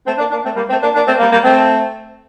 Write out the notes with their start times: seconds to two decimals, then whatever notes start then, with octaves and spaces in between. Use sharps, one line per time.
0.05 A3 C4
0.18 A#3 D4
0.30 A#3 D4
0.43 A3 C4
0.56 G3 A#3
0.69 A3 C4
0.81 A#3 D4
0.94 A#3 D4
1.06 A3 C4
1.19 G3 A#3
1.31 G3 A#3
1.44 A3 C4